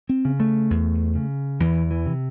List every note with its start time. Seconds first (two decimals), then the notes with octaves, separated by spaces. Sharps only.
0.09 C4
0.25 C#3
0.40 A3
0.70 E2
1.16 C#3
1.60 E2 E3
1.91 E3
2.06 C3